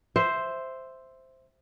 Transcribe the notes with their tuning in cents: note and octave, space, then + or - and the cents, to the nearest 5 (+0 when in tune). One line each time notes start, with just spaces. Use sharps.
C5 +0 E5 +0